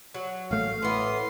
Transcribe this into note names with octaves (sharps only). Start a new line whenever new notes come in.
F#3
A1 A3 F5
A2 E3 B3 C6